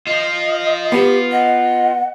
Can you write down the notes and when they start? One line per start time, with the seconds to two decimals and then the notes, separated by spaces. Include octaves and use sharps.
0.07 F4 C5 D#5
0.92 B3 G4
1.32 D#5 F#5